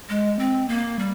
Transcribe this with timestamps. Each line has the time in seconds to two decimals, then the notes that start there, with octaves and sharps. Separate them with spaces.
0.09 G#3
0.39 C4
0.69 A#3
0.99 G3